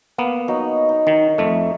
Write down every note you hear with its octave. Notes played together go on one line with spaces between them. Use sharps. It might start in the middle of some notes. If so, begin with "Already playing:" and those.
A#3 B3
F#3 D#4
D#4
D#3
F2 A3